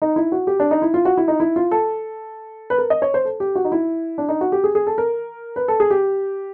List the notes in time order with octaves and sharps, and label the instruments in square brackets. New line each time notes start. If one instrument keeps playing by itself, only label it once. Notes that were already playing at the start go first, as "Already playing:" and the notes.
[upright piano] D#4
E4
F#4
G4
D4
D#4
E4
F4
F#4
E4
D#4
E4
F4
A4
B4
A#4
D#5
C#5
C5
A4
G4
F#4
D#4
E4
D4
D#4
F#4
G4
G#4
G#4
A4
A#4
B4
A4
G#4
G4